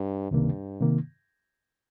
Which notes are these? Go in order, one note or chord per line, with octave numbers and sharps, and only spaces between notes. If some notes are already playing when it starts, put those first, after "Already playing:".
Already playing: G2
C#2 G2 C3 D#3 A#3
C3 D#3 A#3